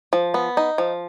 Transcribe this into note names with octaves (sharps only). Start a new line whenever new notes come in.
F3
B3
D#4
F3